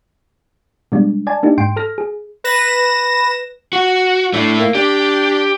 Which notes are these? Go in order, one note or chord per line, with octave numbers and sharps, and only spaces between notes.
B2 G3 G#3 D4
D5 G#5 A5
A#3 D4 D#4 G4
G#2 G5 C6 D7
A4 F6 A#6
G#4
B4 A#6 E7
F#4
A3 D4 E4
A#3
D4 G4